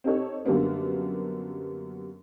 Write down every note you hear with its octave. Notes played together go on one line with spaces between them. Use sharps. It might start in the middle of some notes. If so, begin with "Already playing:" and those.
C4 D#4 G4 A4 C#5
F#2 D3 G3 A#3 B3 D4